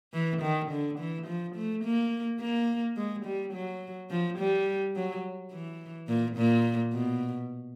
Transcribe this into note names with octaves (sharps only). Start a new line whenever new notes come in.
E3
D#3
D3
E3
F3
A3
A#3
A#3
G#3
G3
F#3
F3
G3
F#3
E3
A#2
A#2
B2